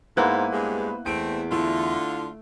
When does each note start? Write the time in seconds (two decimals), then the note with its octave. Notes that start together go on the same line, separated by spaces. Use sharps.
0.17 G#2 A#3 B3 E4 B4 C5 F#6
0.52 G2 G#3
1.06 E2 A3 C4 D7
1.52 D3 A3 E4 F4